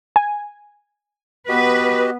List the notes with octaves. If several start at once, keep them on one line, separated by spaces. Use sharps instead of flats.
G#5
B3 F#4 G4 B4 D#5